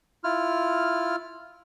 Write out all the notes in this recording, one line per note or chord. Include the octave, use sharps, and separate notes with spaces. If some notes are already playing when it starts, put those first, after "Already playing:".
E4 F4 F6